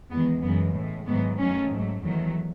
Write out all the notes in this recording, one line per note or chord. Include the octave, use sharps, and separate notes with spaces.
E2 D#3 G#3 B3
F#2 C#3 E3 G#3 B3
A2 G#3
G#2 D#3 F#3 A3 B3
F#2 D#3 F#3 A3 C#4
G#2 F#3 A3
E2 D#3 F#3 A3